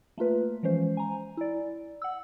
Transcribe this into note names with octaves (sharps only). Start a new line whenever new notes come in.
A3 A#3 F4 B4
E3 F3 G#3 C#4 C5
G#5 A#5
E4 D5
F#5 E6